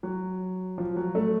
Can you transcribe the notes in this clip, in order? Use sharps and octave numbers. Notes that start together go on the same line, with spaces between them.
F#3
F3
F#3
A3